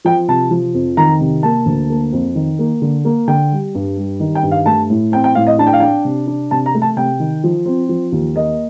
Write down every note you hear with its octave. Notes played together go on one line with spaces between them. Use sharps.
F3 G5
C3 A5
F3
F2
D#3 A#5
C3
A#3 A5
D2
A#3
F2
D#3
A#3
D3
A#3
D3 G5
G3
G2
G3
D#3
G5
G2
F5
A3 A5
A2
C4 G5
G5
A2 F5
D#5
D4 A5
G5
F5
D4 G5
C3
D4
C3 A5
A#5
A3
A5
C3 G5
D#3
F3
C4
F3
D#2
A#3 D#5